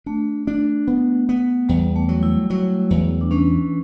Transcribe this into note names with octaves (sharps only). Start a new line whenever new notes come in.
A3 D4
D4
B3
B3
E2 G3
A3
F#3
E4
F#3 E4
E2
D4
E3 C#4